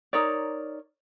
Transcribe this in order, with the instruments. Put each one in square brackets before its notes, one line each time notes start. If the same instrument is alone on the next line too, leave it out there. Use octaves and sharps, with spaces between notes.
[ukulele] D#4 A#4 C#5 D5